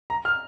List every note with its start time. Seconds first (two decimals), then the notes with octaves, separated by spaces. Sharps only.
0.10 A#5
0.25 F6